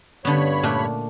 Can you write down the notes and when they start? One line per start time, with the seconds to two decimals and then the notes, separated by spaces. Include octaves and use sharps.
0.25 G2 D3 B3 C#5 B5
0.63 A#2 A3 D4